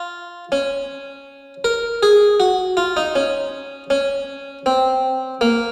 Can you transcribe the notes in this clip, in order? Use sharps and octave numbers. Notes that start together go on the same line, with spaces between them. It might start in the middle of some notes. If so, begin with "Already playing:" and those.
Already playing: F4
C#4
A#4
G#4
F#4
F4
D#4
C#4
C#4
C4
A#3